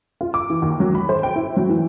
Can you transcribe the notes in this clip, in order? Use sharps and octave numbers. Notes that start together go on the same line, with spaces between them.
F4
D6
E3
D#2
F#3
B5
C5
G5
E4
F#3
E3